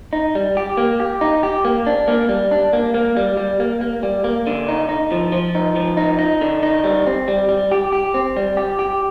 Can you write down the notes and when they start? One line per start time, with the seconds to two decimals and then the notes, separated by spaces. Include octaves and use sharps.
0.13 D#4
0.35 G3
0.57 G4
0.77 A#3
1.00 G4
1.21 D#4
1.43 G4
1.65 A#3
1.87 D4
2.08 A#3
2.29 G3
2.51 D4
2.73 A#3
2.94 A#3
3.17 G3
3.37 G3
3.60 A#3
3.81 A#3
4.03 G3
4.24 A#3
4.47 D3
4.68 D#4
4.89 D#4
5.12 F3
5.32 F3
5.55 D#4
5.76 F3
5.97 D#4
6.19 D#4
6.41 D3
6.63 D#4
6.84 G3
7.06 C4
7.28 G3
7.49 G3
7.72 G4
7.93 G4
8.14 C4
8.37 G3
8.57 G4
8.79 G4